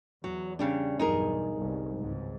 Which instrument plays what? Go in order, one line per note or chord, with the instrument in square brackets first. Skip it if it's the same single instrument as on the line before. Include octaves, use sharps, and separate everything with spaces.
[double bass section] E2 [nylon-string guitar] F#3
[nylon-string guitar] C#3 G3 D4
[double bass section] B1 E2 G2 [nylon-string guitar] D#4 G#4 A#4
[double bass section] G1 C2 G2
G#1 C#2 G#2